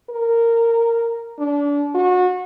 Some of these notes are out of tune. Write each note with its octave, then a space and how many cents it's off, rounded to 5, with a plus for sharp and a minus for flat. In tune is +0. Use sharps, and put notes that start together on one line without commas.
A#4 -10
D4 -30
F#4 -30